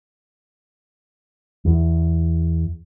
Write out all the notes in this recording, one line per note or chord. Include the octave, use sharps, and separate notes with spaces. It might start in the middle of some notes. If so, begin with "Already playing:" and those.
E2